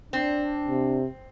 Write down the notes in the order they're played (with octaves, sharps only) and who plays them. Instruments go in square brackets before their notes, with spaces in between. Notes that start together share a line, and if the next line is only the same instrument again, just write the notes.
[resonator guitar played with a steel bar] C4 [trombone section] D4
[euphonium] C3